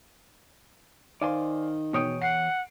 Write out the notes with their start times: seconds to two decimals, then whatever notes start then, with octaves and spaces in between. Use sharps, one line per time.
1.22 D#3 C5 D5 F5 G#5 C6
1.93 E2 B2 C#5 G5 D#6 D7
2.22 F#5 C7